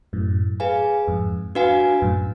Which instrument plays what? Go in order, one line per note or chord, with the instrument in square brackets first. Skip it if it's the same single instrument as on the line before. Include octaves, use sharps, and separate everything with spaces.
[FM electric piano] F#2 A2
[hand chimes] G#4 B4 F5 G#5
[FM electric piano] F2 G#2
[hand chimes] D4 F#4 B4 F5 G#5
[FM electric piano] F#2 A2